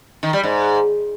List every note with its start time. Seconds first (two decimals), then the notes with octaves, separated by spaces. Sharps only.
0.23 D#3
0.33 G3
0.43 G#2